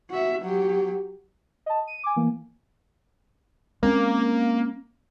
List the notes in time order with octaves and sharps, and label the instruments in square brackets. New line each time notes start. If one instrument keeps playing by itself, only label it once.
[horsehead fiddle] F#4 E5
F#3 G4
[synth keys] D#5 A5
D#7
G#5 D6
E3 A#3
[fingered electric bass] G#3 C4 C#4 [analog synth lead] A#3